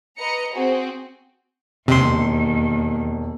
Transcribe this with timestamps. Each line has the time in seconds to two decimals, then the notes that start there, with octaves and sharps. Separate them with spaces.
0.17 B4 D#5 A#5 C#7
0.53 C4 F#4 G#4 C5
1.88 E1 D#2 C3 C6